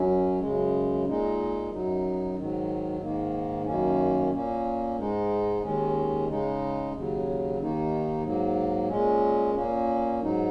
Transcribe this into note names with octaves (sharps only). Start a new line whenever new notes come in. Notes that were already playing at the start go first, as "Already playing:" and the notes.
Already playing: F#2 F#3 C#4
F#2 C#3 G#3
A#2 G#3 D#4
F#2 F#3 D#4
G#2 D#3 F#3
G#2 D#3 A#3
F#2 D#3 A#3 C#4
A#2 A#3 C#4
G#2 G#3 D#4
D#2 D#3 G#3 C#4
C#3 G#3 D#4
D#2 C#3 F#3
D#2 D#3 A#3 D#4
G#2 F#3 A#3
A#2 G#3 C#4
A#2 A#3 C#4
G#2 F#3 D#4